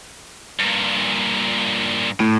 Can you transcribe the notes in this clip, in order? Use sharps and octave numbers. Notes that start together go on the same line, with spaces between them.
G2 A#2
A2